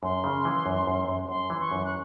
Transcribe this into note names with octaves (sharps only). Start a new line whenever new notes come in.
F#2 C6
C#3
E3
F#2
F#2
F#2
F#2 C6
E3
C#6
F#2
F#6